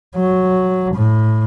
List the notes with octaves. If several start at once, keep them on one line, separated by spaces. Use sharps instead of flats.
F#3
A2